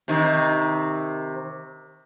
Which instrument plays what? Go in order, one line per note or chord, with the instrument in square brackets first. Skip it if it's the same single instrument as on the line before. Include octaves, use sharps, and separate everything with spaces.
[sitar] C3 D#3